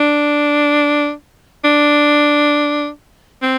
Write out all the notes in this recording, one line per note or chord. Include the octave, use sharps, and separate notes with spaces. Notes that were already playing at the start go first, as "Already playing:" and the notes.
Already playing: D4
D4
C4